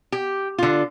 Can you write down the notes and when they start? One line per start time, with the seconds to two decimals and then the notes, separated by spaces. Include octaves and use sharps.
0.12 G4
0.58 D3 F4